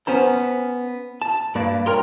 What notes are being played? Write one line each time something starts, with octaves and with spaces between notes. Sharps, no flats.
B3 C#4 C5 A#5
A5
G2 A#3 B4 D5
A#4 C#5 G5 A#5 C6